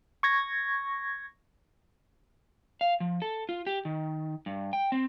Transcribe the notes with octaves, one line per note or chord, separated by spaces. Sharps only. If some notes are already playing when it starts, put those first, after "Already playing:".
C#6 G#6 A#6
F5
F3
A4
F4
G4
D#3
G2
G5
C4